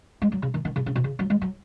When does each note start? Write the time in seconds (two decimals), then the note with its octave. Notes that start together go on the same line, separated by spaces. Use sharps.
0.22 G#3
0.32 F#3
0.42 C#3
0.54 D#3
0.65 D#3
0.76 C#3
0.86 C#3
0.96 B2
1.04 C#3
1.19 F#3
1.30 G#3
1.42 F#3